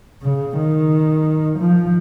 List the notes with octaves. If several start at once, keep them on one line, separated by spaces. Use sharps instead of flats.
C#3
D#3
F3